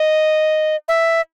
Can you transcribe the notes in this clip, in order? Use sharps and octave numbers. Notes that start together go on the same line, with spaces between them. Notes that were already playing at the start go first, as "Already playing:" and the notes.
Already playing: D#5
E5